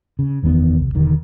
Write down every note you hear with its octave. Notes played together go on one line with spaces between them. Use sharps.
C#3
F#1 E2 D#3 B3
C2
E1 D3 D#3